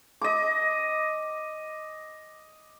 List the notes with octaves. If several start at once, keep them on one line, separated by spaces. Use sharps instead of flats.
D#5 D6